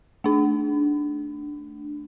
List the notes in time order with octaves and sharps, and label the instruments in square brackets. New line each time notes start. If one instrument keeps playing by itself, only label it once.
[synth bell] A3 D4